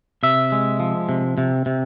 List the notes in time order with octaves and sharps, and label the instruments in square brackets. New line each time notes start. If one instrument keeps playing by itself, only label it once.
[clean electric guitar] C3 E5
G#3
F3
C3
C3
C3